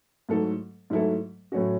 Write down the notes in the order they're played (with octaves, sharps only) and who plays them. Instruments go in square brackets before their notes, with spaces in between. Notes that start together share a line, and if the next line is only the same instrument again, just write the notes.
[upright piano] G#2 F#3 A3 E4 A4
G#2 F#3 A3 E4 A4
A2 F#3 C#4 F#4